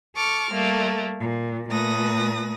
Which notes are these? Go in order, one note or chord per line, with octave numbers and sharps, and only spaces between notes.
A4 C#6 D6 F6
G3 A3 A#3
A#2
A#2 A3 B4 D#6 A#6